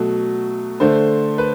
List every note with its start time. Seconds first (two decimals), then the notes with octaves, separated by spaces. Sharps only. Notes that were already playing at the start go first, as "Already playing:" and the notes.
Already playing: B2 F#3 A3
0.80 D3 A3 C5
1.38 B4